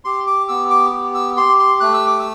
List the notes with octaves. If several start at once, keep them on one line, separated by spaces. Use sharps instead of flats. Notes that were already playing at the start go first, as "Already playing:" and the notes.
G4 C6
D6
B3 E6
D6
G4
E6
G4 C6
C6
A3 F#6
E6
D6
E6